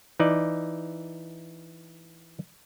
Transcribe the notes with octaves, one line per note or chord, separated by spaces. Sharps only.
E3 D#4 D5